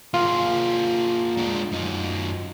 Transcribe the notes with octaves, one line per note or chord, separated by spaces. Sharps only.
A#3 F4 G#4
G#3 D4
F#2 D#4